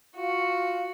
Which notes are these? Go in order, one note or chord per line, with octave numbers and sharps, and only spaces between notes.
F4 F#4